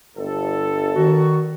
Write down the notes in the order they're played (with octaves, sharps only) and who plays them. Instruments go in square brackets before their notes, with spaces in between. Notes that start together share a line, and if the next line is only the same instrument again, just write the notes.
[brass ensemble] G1 A4
[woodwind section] D#3 F#4